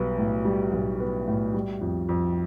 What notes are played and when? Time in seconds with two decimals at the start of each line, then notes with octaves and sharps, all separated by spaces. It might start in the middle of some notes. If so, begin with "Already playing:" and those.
Already playing: B1 G3 B3
0.18 A2
0.45 G3
0.73 B1
1.00 B3
1.28 A2
1.54 G3
1.81 F2
2.09 F2